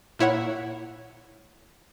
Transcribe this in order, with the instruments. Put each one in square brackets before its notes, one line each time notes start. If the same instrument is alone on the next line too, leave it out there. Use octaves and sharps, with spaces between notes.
[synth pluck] A#2 E4 C#5 F#5